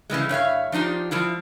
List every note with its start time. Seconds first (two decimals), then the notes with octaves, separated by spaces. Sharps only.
0.10 C#3 E3 G3 G#3
0.29 G2 C#5 E5 F5
0.72 F3 D4 D#4 F4 G4
1.11 F3 G3 E4 F4